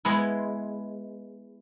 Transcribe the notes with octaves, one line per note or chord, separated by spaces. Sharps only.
G#3 B3 E4